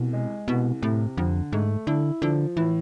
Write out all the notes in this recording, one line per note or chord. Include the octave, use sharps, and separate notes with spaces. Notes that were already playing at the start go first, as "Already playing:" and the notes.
Already playing: C2 B2
G#3
C2 B2
A2 C3
F2 D3
G#2 A3
D3 E4
D3 F3
A2 E3